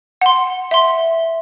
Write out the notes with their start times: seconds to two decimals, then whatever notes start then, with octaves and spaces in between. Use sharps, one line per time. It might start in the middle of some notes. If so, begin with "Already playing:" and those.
0.21 F#5 C6
0.71 E5 C6